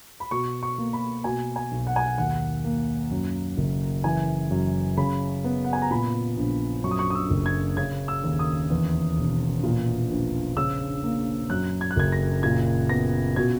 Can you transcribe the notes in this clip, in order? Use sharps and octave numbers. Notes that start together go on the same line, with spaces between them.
B5
B2 C#6
C#6
A#3
B5
B2 G#5
G#5
B1
F#5
G#5
F#5
D#2 F#5
A#3
F#2
F#1
E3 G#5
F#2
C#3 B5
B3
F#5
G#5
A#5
A#2 B5
A#1
F#2 C#6
D#6
C#6
D#6
E6
F#1
G#6
C#3 G#6
E6
D#2
D#6
E2
E1
A#2
A#1
C#3 E6
A#3
F#2 F#6
G#6
F#6
F#1 G#6
A#6
A#2 G#6
B3 A#6
B2 G#6